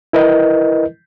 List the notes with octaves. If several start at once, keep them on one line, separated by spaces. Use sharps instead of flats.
E4 A#4 B4 D#5